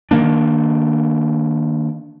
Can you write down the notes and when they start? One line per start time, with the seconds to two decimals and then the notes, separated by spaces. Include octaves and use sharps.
0.11 D#3 A#3 D4